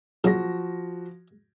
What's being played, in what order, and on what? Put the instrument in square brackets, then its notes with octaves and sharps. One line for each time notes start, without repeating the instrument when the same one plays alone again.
[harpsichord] A#1 C#3 F#3 [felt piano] F3 F#4 A#6